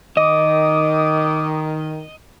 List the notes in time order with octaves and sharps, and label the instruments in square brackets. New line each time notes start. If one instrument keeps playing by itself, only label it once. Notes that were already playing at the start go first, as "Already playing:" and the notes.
[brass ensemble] D#3 [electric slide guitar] D#5 [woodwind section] D6 D#6